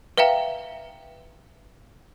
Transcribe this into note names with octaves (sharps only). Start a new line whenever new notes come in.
B4 E5 F5 G5 A#5